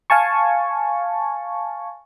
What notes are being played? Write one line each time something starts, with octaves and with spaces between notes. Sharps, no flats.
F5 G#5 A5 C#6